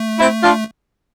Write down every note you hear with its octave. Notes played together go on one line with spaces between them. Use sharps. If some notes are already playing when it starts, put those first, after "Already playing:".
Already playing: A3
C4 E4
D4 F4